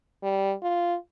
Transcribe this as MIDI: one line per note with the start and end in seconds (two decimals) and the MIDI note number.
0.23 0.54 55
0.63 0.96 65